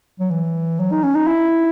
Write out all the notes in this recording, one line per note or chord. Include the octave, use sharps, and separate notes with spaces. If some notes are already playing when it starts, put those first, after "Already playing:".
F#3
E3
F#3
D#4
C#4
D#4
E4